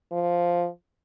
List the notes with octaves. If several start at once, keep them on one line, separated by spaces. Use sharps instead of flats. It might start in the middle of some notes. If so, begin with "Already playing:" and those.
F3